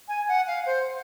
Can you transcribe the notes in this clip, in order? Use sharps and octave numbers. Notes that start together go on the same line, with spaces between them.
G#5
F#5
F5
C5